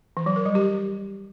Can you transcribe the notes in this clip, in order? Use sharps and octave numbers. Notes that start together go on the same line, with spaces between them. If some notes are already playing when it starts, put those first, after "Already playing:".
E3
F#3
A#4
G3
G4